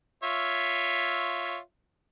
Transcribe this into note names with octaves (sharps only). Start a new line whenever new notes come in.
F4 C#5 E5